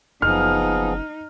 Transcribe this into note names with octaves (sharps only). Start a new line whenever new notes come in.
F#1 F3 B3 D#4 G#4 F6